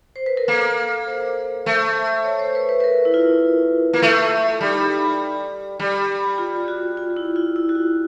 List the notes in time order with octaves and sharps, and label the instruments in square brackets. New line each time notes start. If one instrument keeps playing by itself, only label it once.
[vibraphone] C5
B4
A#4
[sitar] A#3 [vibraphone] A4
[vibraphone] C5
[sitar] A3
[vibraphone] C#5
C5
B4
B4
B4
A#4
E4
F4
[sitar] A#3
A3
[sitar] G3 [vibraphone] D#4
[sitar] G3
[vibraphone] F4
F#4
F4
E4
F4
E4
F#4
F4